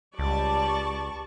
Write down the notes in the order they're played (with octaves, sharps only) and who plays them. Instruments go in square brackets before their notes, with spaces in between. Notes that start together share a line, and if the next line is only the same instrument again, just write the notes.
[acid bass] C#2 [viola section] G3 D5 [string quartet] A5 C#6